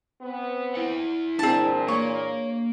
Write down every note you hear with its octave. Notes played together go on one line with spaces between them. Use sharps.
B3 C4
E4 F#5
A#2 E3 C4 D4 G#4 A5
A#3 C#5